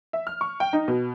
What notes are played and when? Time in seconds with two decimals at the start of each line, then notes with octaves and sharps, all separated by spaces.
0.13 E5
0.27 F6
0.41 C#6
0.60 G5
0.73 D#4
0.88 B2